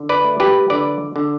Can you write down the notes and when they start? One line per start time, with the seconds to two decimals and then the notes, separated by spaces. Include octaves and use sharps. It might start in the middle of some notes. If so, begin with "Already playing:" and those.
Already playing: D3
0.09 B4 D5
0.24 A3
0.40 G4 B4
0.70 D3 B4 D5
1.16 D3